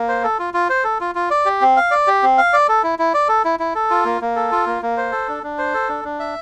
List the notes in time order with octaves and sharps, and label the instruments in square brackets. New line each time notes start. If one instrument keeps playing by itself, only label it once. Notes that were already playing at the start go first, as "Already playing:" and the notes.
Already playing: [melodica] A#3
C5
A4
F4
F4
C5
A4
F4
F4
D5
G4
C4
F5
D5
G4
C4
F5
D5
A4
E4
E4
D5
A4
E4
E4
A4
F4
A#3
A#3
A4
F4
A#3
A#3
C5
A4
D4
D4
C5
A4
D4
D4
E5